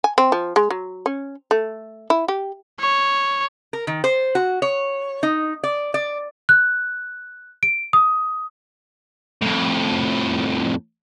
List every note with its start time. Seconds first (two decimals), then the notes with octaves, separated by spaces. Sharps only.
0.04 G#5
0.18 C4
0.32 F3
0.56 G#3
0.70 F#3
1.06 C#4
1.51 A3
2.10 E4
2.28 G4
2.80 C#5
3.73 A#4
3.87 D#3
4.04 C5
4.35 F#4
4.62 C#5
5.23 D#4
5.64 D5
5.94 D5
6.49 F#6
7.63 D7
7.93 D#6
9.42 F2 A2